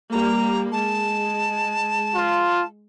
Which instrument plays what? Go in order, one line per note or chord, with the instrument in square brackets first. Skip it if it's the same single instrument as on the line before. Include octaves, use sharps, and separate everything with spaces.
[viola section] G3 A#3 [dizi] A#5
[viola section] G#3 [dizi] A5
[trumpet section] F4